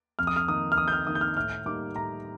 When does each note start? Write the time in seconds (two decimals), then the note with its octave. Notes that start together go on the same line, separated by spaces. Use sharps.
0.19 F2 F6
0.27 D#6
0.36 F6
0.48 D#3 A#3 D#4 D#6
0.72 F6
0.78 F2 D#6
0.88 G6
0.92 F6
1.07 D#3 A#3 D#4 D#6
1.15 G6
1.21 F6
1.36 A2 F6
1.65 G3 A#3 D#4 D6
1.95 A2 A#5